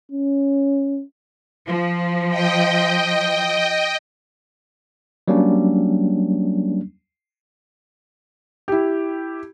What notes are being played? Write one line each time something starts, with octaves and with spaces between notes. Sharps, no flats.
C#4
F3
D#5 G5
F#3 G3 A#3 C#4 D4
E4 G4